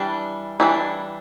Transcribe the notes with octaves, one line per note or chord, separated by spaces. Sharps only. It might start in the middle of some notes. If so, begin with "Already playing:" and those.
Already playing: E3 G3 D4
E3 G3 D4